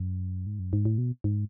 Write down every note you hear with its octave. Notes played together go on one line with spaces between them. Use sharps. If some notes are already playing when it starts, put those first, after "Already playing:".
Already playing: F#2
G#2
F#2
G#2
A2
B2
G#2